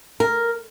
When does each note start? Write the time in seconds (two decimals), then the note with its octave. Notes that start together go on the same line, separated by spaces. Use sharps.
0.20 A#4